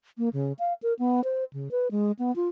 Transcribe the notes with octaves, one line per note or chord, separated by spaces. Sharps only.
A#3
C#3
F5
A#4
B3
C5
C#3
B4
G#3
B3
F4